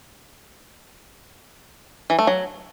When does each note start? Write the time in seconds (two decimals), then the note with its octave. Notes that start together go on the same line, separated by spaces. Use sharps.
2.10 E3
2.19 A3
2.27 F#3